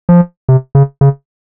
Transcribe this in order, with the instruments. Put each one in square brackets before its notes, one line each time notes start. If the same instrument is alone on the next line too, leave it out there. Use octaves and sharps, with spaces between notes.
[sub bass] F3
C3
C#3
C#3